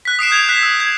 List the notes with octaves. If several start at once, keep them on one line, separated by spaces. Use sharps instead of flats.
F#6 B6
D#6 C7 D7 E7
G6 G#6 F7
F#6 B6
E6
G#6